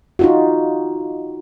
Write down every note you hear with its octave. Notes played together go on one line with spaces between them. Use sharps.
D#4 F4 F#4